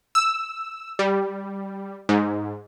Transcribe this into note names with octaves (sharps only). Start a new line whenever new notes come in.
E6
G3
G#2